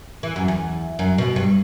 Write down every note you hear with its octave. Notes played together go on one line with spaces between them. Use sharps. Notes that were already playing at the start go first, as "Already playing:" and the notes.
E3
F#2
E2
F#2
B2
G2